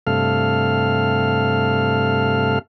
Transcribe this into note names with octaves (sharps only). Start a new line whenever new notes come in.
G2 C3 A3 A4 F5 F6